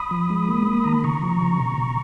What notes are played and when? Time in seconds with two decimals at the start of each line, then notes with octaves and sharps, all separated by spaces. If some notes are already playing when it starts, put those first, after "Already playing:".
Already playing: B5 D#6
0.11 F3
0.30 G#3
0.49 A#3
0.67 A#3
0.84 D#3 A#5
0.94 B5
1.04 C#3 A#5 C#6
1.22 F3
1.41 C#3
1.59 B2
1.78 B2